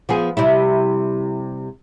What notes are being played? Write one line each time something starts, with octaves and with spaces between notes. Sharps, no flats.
F3 B3 G#4
C3 G3 E4